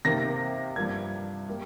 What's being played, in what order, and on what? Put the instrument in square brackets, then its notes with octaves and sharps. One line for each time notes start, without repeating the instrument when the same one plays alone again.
[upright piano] C3 D#3 A#3 A#6
G2 F3 A#3 G#6
G3 A#3